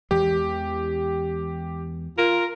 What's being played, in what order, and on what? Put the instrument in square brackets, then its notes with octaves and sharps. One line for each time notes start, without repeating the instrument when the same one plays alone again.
[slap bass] E2 E3 G#3 [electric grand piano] G4
[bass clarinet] F4 [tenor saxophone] A#4